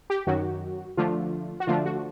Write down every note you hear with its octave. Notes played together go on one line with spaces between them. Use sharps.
G4
F#2 D#3 F#3 F#4
D3 F3 A3 D4 F4
F#4
D3 F3 A3 D4 F4
F#4